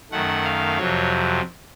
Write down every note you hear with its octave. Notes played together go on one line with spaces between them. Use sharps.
F#2 D#3 A3 F#5
F5
F2 C3 F#3 C#5